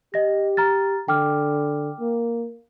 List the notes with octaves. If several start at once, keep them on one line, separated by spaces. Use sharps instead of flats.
G4 D#5 A#6
A#5 F6 A6
D3 G5 D6 F6
A#3